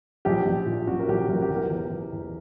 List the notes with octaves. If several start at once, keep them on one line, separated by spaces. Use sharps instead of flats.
A#1 G4
A#1
A#2
A#1 F#4
A#4
A#1 G4
A#1 A#4
G4
E2
A#4
E2
E2
E2